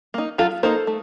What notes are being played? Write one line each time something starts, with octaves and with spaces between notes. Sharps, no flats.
A#3 D#4
F#3 F4 A4
A#3 D#4 A4 C5
A3